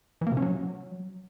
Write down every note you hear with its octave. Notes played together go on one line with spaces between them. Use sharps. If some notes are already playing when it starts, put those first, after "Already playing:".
E3
A#3
C3
C#4
F#3